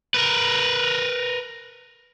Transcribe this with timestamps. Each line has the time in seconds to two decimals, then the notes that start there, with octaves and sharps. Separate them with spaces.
0.14 A#4 B4